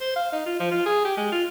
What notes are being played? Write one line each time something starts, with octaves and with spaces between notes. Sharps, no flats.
C5
F5
D#4
F4
F3
F4
G#4
G4
G#3
F4